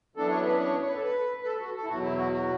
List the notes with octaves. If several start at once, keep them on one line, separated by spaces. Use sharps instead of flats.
F#2 E3 B3 D4 A4
C#5
B4
C#5
C#5
B4
A4
B4
B4
A4
F#4
A4
E4
E2 B2 F#3 F#4
E4
F#4
F#4